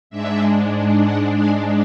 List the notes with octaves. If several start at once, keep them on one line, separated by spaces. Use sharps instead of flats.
G#2 G#3 D4 E5
F#5
G#5